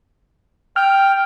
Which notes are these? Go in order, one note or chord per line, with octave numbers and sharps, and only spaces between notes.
G5 F6